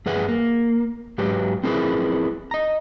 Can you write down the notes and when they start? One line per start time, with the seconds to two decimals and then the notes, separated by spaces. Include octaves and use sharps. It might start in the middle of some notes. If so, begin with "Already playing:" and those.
0.06 G2 G#4 B4 F#5
0.29 A#3
1.18 G#2 F#3 G4 B4
1.63 C4 E4 G#4 A#4 B4
2.51 D#5 A#5